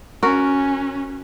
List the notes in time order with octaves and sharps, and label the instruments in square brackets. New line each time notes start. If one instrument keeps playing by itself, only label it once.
[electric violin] C#4 [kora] F#4 A#4